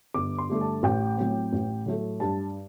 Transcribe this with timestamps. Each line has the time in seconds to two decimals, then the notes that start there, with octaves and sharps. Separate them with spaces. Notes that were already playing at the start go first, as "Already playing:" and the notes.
0.14 G1 D6
0.38 C6
0.49 G2 D3 A3
0.61 A5
0.83 A1 G5
1.17 A2 F#3 C4
1.53 A1
1.86 A2 F#3 A3
2.20 G2 A5